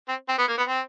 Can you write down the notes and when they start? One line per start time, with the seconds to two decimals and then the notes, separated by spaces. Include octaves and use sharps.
0.08 C4
0.29 C4
0.38 B3
0.48 A#3
0.58 B3
0.68 C4